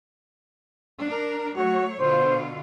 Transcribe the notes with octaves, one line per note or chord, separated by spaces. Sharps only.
D4 A#4
F#3 A3 F#4 C#5
B2 D3 F4 C5